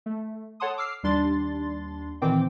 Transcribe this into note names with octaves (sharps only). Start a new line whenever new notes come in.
A3
A4 C#5 F#5 A5 C6 D#6
D6 E6 F6 C7
D#2 G3 D4 C6 A6
A#2 D#3 E3 C4 G5 D6